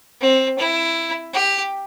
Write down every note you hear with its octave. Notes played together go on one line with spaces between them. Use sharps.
C4
E4
G4